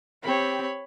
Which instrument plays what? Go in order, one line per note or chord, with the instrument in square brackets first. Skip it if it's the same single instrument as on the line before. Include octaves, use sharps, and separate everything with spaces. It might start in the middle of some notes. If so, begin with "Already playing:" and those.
[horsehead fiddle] C4 G4 [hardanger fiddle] C#5 B5